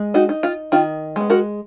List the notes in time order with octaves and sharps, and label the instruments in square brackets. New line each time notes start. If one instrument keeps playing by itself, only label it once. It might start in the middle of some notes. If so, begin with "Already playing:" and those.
Already playing: [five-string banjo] G#3
D#4 F#4
D#4
F4
D#3 F4
G#3 B3
F#4 A#4